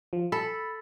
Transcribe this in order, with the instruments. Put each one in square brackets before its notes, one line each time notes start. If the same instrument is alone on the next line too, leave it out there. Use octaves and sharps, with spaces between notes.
[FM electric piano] F3
[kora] A4 [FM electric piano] B5